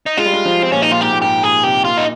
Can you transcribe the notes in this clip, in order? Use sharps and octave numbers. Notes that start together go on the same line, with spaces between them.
D#4
G#3 F4
G3
G#3
F3
C4
A#2 C#4
D#4
A#2 F4
G#2 G4
A#2
G#2 G4
A#2 G#4
C3 G4
A#2 F4
D#4